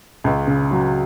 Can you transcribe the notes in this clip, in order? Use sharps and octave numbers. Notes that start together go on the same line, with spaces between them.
C#2
C#3
F#3